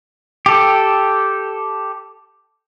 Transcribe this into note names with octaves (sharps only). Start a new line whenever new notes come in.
G4 A4